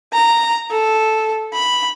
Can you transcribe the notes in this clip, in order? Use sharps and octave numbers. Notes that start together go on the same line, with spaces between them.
A#5
A4
B5